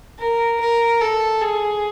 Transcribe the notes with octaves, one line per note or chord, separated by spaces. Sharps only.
A#4
A#4
A4
G#4